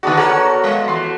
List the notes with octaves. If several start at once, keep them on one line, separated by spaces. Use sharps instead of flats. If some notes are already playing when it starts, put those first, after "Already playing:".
D3 B3 D4 F#4 G#4
F#4 A4 A#4 C#5
G#3
E3 A3 C6